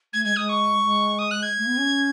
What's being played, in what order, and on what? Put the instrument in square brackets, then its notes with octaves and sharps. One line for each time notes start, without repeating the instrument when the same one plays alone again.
[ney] A3 [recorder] G#6
[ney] G#3 [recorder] G#6
[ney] G#3 [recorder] D#6
[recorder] C#6
[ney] G#3
[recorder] D#6
F#6
G#6
[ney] A3
B3
C#4